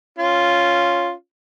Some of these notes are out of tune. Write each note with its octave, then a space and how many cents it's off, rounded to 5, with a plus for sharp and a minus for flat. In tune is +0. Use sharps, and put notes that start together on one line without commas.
C#4 +0 F4 +0